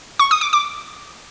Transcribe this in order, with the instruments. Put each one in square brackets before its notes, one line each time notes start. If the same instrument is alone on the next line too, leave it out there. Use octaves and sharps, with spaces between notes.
[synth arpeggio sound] C#6
D#6
D6
D6